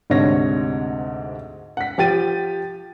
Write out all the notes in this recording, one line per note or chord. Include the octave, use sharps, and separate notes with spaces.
D2 G#2 C3 D4 C#5 A#6
F#5 B6
F3 G4 A6 D#7